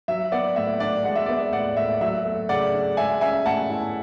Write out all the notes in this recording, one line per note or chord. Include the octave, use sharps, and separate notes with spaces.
F#3 E5
B3 D5 F#5
A2 E5
D4 D5
G#3 F#5
E5
B3 D5
E5
A2 D5 F#5
A2 E5
F#3 E5
A3
C#3 D5 F#5
D4
G#3 E5 G#5
C#4 E5 G#5
A2 F#5 A5
E4